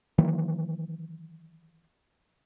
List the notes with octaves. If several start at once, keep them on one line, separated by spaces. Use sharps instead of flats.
D#3 E3 F#3 A#3